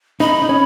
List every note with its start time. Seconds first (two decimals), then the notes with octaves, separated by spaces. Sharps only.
0.20 D#4 B5
0.42 D#4
0.49 C#4